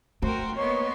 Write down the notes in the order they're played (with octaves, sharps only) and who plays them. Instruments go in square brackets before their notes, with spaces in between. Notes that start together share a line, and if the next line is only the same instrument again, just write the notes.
[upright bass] A3 [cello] F#4 G5 [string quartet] A#4 C5
[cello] A#3 B3 [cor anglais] C#5 [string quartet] D#5 C6 C#6